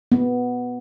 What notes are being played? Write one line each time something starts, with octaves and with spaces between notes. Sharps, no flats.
B3